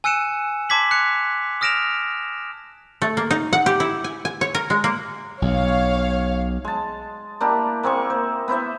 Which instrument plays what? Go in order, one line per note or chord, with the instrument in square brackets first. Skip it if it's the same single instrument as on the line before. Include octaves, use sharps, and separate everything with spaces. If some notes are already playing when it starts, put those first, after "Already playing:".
[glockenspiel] G#5 E6 F#6 C#7 D#7 E7
A5 C6 D6 G#6 B6 F#7
F#6 C#7 F7
D#6 F6 A#6 D7 E7 F7
[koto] A3
A#3
D#4
F#5
G4
E4
G#5
G#5
C#5
A#4
G#3
A#3
[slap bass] B1 [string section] C#5 F5
[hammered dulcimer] G#3 A5
A#3 D4 E4 G4
A#3 C4 G#4 C#6
C5
B3 E4 C5 E5